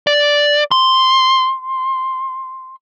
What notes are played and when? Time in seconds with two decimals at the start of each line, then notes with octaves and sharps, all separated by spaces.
0.07 D5
0.71 C6